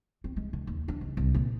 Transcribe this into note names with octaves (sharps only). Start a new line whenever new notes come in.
C4
G#3
D3
D#2
D4
C#2
C2
A#2